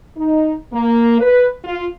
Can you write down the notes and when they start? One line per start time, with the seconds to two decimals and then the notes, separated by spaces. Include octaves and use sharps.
0.17 D#4
0.73 A#3
1.20 B4
1.64 F4